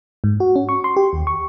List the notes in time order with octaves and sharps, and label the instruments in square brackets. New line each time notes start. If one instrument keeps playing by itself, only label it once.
[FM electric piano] G#2
F#4
C#4
C#6
C6
G4
D#2
C#6